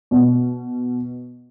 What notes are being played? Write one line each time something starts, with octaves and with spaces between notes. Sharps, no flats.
B2